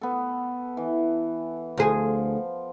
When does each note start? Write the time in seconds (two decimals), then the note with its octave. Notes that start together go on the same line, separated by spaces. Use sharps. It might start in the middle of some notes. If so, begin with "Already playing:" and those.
0.01 B3 A4
0.77 E3
1.77 D2 F3 G#4